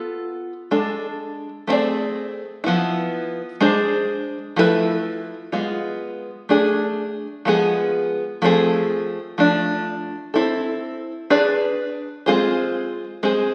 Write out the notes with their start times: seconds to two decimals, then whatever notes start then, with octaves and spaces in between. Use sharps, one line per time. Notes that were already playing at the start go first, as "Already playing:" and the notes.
Already playing: B3 F4 A4
0.71 G#3 D4 A4
1.67 A3 C4 E4 G#4 D5
2.64 F3 B3 E4
3.61 G#3 D4 G#4 C5
4.56 F3 A3 E4 G#4 B4
5.52 G#3 B3 F4
6.49 A3 D4 G#4
7.45 F3 G#3 B3 F4 G#4
8.42 F3 A3 C4 F4 G#4
9.38 F3 A3 D4
10.34 C4 E4 A4
11.30 D4 G#4 B4 D5
12.26 G#3 C4 F4 G#4 C5
13.23 G#3 C4 G#4 C5